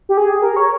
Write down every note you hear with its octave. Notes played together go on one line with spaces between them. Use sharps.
G4
G#4
A#4
C#5